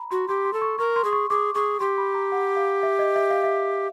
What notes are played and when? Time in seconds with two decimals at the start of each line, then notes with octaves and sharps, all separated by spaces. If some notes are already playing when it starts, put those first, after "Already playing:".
Already playing: A#5 B5
0.11 F#4 C6
0.28 G4 C6
0.45 C6
0.53 A4
0.62 C#6
0.79 A#4 C#6
0.96 C6
1.04 G#4
1.13 C#6
1.30 G#4 D6
1.55 G#4 C#6
1.80 G4 C6
1.98 B5
2.14 A#5
2.32 F#5
2.56 F5
2.83 E5
2.99 D#5
3.16 E5
3.30 F5
3.44 E5